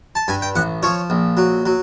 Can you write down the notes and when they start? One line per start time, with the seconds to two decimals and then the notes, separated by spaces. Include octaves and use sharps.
0.15 A5
0.28 G2 G#5
0.42 G5
0.56 A1 F#5
0.83 F3 C#5
1.10 A#1
1.37 F#3
1.66 F#3